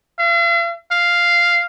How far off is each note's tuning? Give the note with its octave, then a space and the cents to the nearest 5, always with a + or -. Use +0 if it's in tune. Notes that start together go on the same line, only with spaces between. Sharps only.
F5 -45
F5 -5